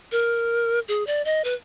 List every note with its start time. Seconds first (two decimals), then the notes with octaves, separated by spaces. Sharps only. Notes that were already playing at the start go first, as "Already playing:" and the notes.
0.12 A#4
0.88 G#4
1.07 D5
1.25 D#5
1.44 B4